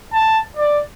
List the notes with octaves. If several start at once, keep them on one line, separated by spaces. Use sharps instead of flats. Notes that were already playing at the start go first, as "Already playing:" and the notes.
A5
D5